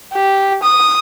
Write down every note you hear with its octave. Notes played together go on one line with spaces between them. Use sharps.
G4
D#6